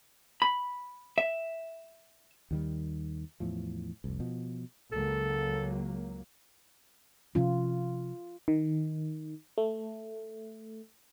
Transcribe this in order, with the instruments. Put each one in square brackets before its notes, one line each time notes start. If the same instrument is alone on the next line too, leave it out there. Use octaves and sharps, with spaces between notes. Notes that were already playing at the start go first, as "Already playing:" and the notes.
[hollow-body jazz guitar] B5
E5
[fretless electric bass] D#2 D#3 G3
E2 A2 F3
F1 C2
B2 F3
[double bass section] C#2 F#3 A#3 [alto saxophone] A4
[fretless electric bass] C3 F3 C#4 [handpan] F4
[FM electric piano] D#3
A3